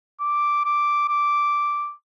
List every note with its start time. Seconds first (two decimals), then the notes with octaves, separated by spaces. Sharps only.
0.20 D6
0.65 D6
1.09 D6